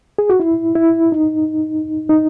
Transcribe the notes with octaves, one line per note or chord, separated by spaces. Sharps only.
G#4
F#4
E4
E4
D#4
D#4